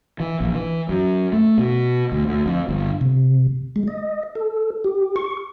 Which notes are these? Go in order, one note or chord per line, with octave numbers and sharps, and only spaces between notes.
E3
A#1
E3
F#2
A3
B2
D2
D2
F2
G1
C3
G#3
D#5
A4
G4
C#6